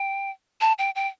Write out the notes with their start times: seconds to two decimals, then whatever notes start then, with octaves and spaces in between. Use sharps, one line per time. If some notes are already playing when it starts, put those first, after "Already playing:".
Already playing: G5
0.61 A5
0.78 G5
0.96 G5